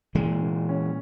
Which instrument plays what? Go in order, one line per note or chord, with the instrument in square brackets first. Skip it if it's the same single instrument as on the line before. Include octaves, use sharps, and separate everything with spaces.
[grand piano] A#2 [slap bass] E3 G#3
[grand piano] A#2
C#4